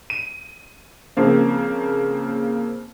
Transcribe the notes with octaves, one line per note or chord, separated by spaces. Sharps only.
D#7
C#3 F3 A#3 C4